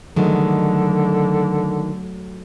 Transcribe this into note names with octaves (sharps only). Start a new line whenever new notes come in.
D3 D#3 F#3 G#3 A3